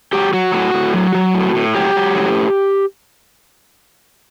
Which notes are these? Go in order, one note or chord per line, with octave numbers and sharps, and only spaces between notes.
F#3 G4
F#3 F#4
A2 F#4
A2
F#3
F#3
A2
A2
F#3 G4
F#3
A2